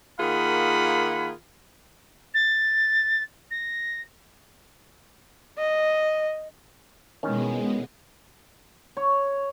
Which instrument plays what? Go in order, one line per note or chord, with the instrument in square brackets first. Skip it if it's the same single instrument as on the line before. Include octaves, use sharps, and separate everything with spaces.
[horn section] D#3 A#3 F4 G#4 F#5 B5
[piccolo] A6
A#6
[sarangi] D#5
[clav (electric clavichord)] E2 D#3 C#4 [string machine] B2 G#3 B3
[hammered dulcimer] C#5